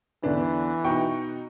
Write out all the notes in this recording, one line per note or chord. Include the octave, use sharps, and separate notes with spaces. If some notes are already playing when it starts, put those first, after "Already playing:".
E2 D3 E3 D4 B4
B2 D#4 F#4 G5 C#6